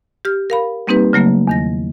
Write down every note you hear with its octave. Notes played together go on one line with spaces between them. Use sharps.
G4 F6
A#4 F5 B5
G3 A#3 C4 D#4 G4 B4
C#3 F#3 A3 A#3
E2 D#3 A#6